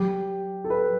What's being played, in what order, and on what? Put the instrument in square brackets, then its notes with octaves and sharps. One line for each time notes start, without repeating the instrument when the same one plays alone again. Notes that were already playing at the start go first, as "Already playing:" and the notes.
Already playing: [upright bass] F#3 [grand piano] G4
[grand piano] A4
B4